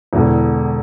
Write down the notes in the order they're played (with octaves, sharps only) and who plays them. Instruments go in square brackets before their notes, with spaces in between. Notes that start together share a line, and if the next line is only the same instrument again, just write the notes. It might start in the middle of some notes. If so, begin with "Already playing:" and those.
[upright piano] E1 E2 D3